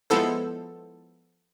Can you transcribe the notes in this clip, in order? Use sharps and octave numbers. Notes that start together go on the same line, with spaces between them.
F3 G#3 B3 E4 A4 C5